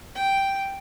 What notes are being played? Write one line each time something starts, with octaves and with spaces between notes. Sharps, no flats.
G5